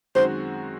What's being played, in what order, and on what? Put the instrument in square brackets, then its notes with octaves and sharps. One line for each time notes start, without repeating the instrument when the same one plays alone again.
[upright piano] F#2 D#3 G#3 C4 F#4 [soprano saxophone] C5